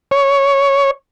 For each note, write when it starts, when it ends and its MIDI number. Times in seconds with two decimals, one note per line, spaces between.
0.11 0.91 73